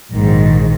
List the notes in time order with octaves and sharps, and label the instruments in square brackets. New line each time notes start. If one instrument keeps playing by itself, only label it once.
[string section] A#1 G#2 D#3